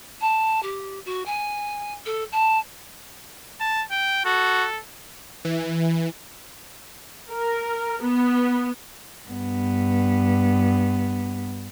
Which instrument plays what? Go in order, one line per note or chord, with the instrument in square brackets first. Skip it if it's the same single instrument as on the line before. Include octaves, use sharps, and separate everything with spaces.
[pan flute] A5
G4
F#4
G#5
A4
A5
[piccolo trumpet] A5
G5
[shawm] F#4 [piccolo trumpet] A4
[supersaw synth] E3
[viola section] A#4
B3
[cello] G2 B3